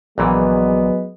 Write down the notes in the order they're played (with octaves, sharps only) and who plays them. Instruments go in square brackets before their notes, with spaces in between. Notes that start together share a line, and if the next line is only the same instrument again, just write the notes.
[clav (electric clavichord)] A#1 A#2 E3 [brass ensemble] F#3 G#3 B3